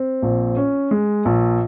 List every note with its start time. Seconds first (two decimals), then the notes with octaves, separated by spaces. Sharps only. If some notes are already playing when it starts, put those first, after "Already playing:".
Already playing: C4
0.22 A#1
0.57 C#4
0.91 G#3
1.25 A#1